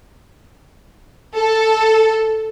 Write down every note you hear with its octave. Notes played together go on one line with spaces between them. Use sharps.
A4